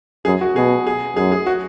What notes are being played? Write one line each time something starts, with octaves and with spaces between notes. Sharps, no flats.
F#2 G#4
F#4
B2 G#4
G#4
F#2 G#4
G#4
F#4